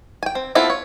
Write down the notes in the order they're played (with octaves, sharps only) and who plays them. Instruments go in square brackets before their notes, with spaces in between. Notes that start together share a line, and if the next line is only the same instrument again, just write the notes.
[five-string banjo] G5 G#5
C4
B3 C4 E4 F4 A4
C#5